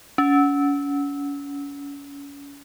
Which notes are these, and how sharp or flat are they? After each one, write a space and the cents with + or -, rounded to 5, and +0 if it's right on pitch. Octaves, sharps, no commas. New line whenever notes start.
C#4 +35